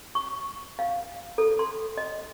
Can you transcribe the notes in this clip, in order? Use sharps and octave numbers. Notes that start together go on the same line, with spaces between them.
C#6
F5
A4
C6
D#5